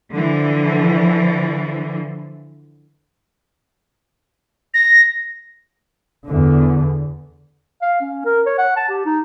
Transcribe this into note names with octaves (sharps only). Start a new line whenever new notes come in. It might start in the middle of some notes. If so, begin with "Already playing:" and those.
D3 E3 F3
A#6
E2 D3
F5
C#4
A#4
C#5
F#5
A5
G4
D#4